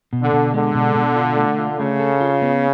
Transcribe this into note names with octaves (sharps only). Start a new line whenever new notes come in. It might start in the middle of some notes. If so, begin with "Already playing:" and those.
B2
D3
B2
D3 G#3
B2
B2
F4
A3
F4
C#3 A3
A4
F4
B3